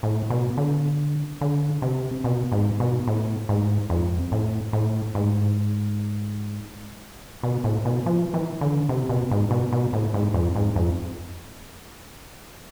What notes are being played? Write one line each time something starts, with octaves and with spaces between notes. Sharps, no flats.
A2
B2
D3
D3
C3
B2
G#2
B2
A2
G#2
F2
A2
A2
G#2
B2
A2
B2
F3
E3
D3
C3
B2
G#2
B2
B2
A2
G#2
F2
G#2
F2